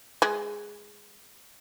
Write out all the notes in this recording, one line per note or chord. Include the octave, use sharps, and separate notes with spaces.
G#3 G#4